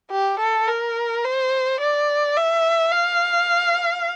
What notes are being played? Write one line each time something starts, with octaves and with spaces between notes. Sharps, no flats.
G4
A4
A#4
C5
D5
E5
F5